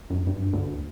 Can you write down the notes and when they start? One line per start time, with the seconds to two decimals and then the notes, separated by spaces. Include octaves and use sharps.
0.10 F#2
0.27 G2
0.53 D2